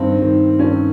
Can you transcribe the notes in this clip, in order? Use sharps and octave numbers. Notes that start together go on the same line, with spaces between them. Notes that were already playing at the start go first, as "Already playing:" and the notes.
Already playing: G2 D#3 C4
G2 D#3
G2 D#3 C#4